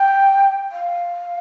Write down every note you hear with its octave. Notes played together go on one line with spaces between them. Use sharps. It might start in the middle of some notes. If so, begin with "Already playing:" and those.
Already playing: G5
F5